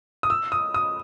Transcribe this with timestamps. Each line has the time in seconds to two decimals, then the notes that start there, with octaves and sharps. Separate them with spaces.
0.23 D#6
0.30 E6
0.52 D#6
0.74 D#6